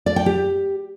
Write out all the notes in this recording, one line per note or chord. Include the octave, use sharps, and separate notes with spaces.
D5
G5
G4